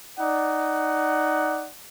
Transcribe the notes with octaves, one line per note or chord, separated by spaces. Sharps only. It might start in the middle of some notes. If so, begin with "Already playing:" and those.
D#4 D5 F#5